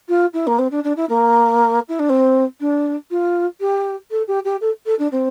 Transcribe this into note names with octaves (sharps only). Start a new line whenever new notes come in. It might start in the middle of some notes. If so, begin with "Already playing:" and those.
F4
E4
A#3
C4
D4
D4
E4
A#3
E4
D4
C4
D4
F4
G4
A4
G4
G4
A4
A4
D4
C4